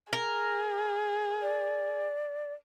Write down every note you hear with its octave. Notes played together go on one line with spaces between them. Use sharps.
G#4 A#4
D5